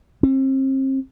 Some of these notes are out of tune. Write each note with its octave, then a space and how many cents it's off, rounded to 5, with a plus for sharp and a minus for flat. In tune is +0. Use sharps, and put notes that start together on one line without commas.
C4 +35